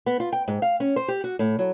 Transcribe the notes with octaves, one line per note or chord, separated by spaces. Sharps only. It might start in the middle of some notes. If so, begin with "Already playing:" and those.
B3
F4
G5
G#2
F5
C#4
C5
G4
F#4
A2
F#3